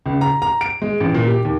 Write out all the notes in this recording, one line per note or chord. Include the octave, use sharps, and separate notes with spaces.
C#2
A#5
A#5
D7
G#3
A1
A#2
G4
D#2